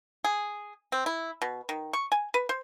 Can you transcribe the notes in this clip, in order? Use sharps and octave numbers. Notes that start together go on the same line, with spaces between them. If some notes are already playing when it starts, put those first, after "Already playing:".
G#4
C4
E4
B2
D#3
C#6
G#5
B4
C5